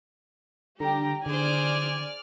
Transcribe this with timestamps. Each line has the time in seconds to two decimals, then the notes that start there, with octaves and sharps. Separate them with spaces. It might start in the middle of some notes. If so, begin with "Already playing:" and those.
0.80 D3 G3 G4 G5 A#5
1.26 D3 G#4 C5 D5 G#5 F6